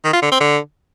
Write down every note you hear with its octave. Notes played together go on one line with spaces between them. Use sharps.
D#3
F4
D3
C4
D3